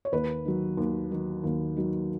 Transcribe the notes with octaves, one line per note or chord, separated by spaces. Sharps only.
C#5
D#2 B4
D#3 F#3
D#2
D#3 F#3
D#2
D#3 F#3